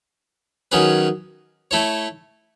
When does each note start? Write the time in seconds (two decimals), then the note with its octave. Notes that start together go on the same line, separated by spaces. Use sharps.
0.72 D#3 F#3 C#4 G#4 B4
1.71 A3 E4 A4 C#5